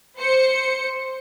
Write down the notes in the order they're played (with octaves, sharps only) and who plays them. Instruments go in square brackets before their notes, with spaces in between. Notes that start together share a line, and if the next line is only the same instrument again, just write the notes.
[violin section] C5 C#7